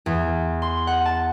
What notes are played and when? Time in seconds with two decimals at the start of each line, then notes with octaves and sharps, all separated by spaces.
0.06 E2
0.62 C6
0.87 F#5
1.05 A5